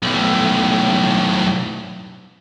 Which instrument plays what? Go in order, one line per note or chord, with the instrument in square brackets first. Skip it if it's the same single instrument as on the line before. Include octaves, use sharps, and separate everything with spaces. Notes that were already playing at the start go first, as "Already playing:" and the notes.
[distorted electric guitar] B1 A2